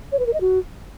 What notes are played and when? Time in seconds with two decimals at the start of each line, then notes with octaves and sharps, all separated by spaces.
0.12 C#5
0.19 B4
0.26 A#4
0.34 D#5
0.41 F#4